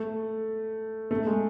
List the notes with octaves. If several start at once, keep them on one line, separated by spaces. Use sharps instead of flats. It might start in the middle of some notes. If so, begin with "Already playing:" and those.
Already playing: A3
A3
G#3